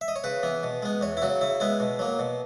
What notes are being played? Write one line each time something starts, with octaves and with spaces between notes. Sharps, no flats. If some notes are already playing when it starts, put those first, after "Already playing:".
E5
D#5
C#5
C#3 B4
E3 B3
B2
G#3 B3
E2 C#5
E4
C#3 F#3 F#4
C#3 E4
G#3 B3 E4
B2
F#3 A#3
B2